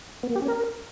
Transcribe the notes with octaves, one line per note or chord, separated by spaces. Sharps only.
B3
A#3
G4
C#4
A#4